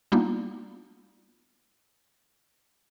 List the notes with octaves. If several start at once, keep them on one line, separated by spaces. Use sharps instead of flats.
G3 A#3 B3 D4 D#4 F4